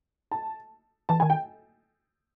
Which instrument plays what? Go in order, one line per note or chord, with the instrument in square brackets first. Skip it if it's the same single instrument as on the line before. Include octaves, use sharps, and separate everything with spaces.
[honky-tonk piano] A5
[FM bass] E3 [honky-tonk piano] A5
[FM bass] D#3 [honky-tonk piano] G#5
[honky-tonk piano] G5